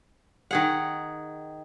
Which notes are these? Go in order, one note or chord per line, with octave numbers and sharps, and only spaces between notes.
D#3 G#4 F#5